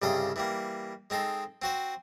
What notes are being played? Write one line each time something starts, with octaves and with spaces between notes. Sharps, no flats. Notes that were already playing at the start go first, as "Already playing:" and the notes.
C2 G2 C#3 A4 D#5
E3 G3 A#3
G#3 C4 D#4 A4
C4 F#4 C5